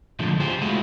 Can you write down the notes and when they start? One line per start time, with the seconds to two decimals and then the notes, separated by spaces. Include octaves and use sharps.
0.19 C#2 D3 F3 G#3 A3
0.40 F4 G4 G#4 C5
0.61 G#3 A3 E4 F#4 G#4 F5